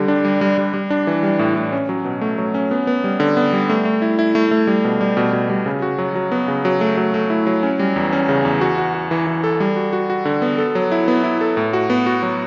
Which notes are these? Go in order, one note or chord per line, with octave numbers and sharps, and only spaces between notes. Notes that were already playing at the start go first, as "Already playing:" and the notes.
Already playing: D3 G3 G4
D4
G3
G3
G3
G3
D4
E3
G3
A2
A2
C#4
F#3
B2
A3
F#3
C#4
B3
B3
G3
D3
B3
G3
A3
A3
E4
E4
A3
A3
G3
B2
G3
B2
B2
G3
C#3
F#4
F#3
F#3
B3
C#3
F#3
A3
F#3
A3
E4
F#3
C#4
G3
E2
C#4
C#3
E2
F#4
F#4
F#4
E3
E3
A4
G3
F#4
F#4
F#4
D3
B3
A4
F#3
E4
B3
E4
A4
A2
F#4
B3
F#4
F#3